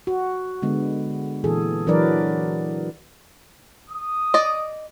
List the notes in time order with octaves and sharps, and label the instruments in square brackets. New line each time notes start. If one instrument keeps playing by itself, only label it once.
[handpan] F#4
D3 G#3 B3
A#2 E3 G#4 A4
E3 F#3 D4 A#4 B4 D5
[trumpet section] D#6
[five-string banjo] D5 D#5